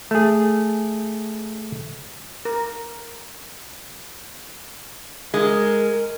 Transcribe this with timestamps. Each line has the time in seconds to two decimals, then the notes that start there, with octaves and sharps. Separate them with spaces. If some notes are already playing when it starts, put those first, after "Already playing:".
0.11 A3 G#4
2.45 A#4
5.34 G#3 A#4